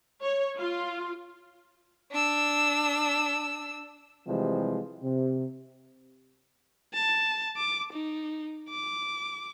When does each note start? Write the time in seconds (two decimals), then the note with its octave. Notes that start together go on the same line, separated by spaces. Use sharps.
0.22 C#5
0.57 F4
2.11 D4 E6
4.28 C3 E3 F3 G3 G#3
5.03 C3
6.94 A5
7.57 D6
7.93 D#4
8.70 D6